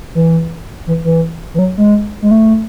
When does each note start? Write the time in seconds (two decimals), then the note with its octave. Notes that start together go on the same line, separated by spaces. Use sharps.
0.15 E3
0.87 E3
1.04 E3
1.54 E3
1.59 F#3
1.78 G#3
2.22 G#3
2.31 A3